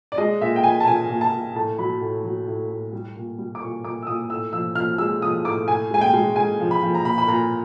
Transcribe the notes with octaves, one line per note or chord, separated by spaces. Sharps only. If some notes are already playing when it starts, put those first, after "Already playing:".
D5
G#3 D#5
A#2 E5
G5
A#2 G#5
A5
A#2 G#5
A#2
A5
A#2
A2 A5
F#3 B5
A2
F#3
A2
A2
G3
A#2
G3
D6
A#2 C#6
A#2 D6
E6
A#2 D#6
A2 E6
F3 E6
F3 F6
G#3 E6
F3 D#6
A2 D6
A2 G#5
G#3 G#5
G5
G#3
G#3 G#5
F3
B5
F3
A#5
A#2 B5
B5
A#2 A#5